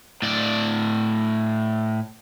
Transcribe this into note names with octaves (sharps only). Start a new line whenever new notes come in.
A2 D5